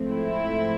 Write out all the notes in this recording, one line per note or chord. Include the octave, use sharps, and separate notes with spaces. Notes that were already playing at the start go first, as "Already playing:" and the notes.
Already playing: G#2 F3 A3 C4
E4